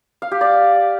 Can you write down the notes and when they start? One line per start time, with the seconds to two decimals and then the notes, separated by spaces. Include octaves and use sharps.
0.22 F5
0.31 G4
0.41 D5